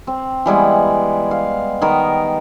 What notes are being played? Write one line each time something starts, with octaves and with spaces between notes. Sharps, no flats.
C4
E3 G3 G#3 B3
F5
D#3 B3 A#4